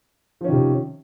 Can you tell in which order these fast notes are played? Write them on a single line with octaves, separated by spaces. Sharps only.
F3 C#4 D#3 C3